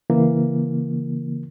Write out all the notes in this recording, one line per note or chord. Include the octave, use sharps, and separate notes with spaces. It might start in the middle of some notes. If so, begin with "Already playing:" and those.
C#3 E3 A#3